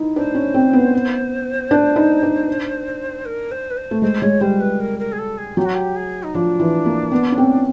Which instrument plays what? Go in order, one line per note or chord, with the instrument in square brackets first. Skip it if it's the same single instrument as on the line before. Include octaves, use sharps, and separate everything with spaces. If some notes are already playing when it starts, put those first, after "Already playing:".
Already playing: [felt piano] D#4 E4
[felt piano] D4 [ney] C5
[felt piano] C#4
C4
B3
D4
D#4
D4
[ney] A#4
C5
B4
C5
[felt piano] A3
[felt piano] G#3 [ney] C5
[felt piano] G#3 [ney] C#5
[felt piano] G3 [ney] C5
[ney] B4
A#4
A#4
G#4
A4
G#4
[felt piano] F#3 [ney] G4
[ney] F#4
G4
G#4
D#4
[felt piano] F3 [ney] D4
[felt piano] E3
A#3
B3
C#4
C4